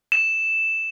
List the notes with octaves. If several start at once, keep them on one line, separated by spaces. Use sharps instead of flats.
E7